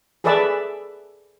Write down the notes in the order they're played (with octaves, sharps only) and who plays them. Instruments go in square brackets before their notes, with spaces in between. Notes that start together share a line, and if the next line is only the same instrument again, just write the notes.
[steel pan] G#4 A4 B4 D5 E5 A5